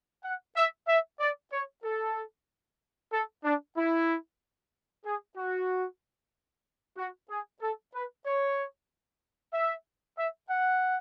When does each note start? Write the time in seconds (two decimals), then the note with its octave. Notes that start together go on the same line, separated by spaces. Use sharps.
0.24 F#5
0.56 E5
0.88 E5
1.20 D5
1.51 C#5
1.84 A4
3.12 A4
3.44 D4
3.76 E4
5.05 G#4
5.36 F#4
6.97 F#4
7.29 G#4
7.61 A4
7.93 B4
8.25 C#5
9.53 E5
10.17 E5
10.49 F#5